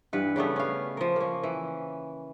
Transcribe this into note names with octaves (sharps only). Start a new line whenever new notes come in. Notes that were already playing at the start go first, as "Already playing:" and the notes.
G2 E3 B4 F#5
C#3 G3 A3 B3
C#4 F5
F3 A#4
A#3 C#4
E3